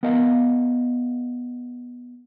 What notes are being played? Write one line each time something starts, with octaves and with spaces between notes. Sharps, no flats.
B3 A#4 D#5 F5